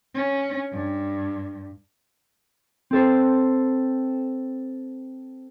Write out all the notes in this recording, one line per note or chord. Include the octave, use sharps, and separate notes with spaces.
C#4
G2
C4 A4 C5